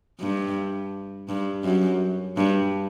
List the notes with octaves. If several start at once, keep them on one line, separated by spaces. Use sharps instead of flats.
G2
G2
F#2
G2